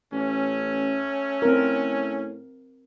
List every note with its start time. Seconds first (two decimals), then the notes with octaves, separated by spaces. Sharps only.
0.12 A1 A3 C#4
1.42 A2 C4 A#4